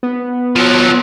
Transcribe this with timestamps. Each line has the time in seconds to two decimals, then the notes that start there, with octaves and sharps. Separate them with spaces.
0.03 B3
0.56 F3 F#3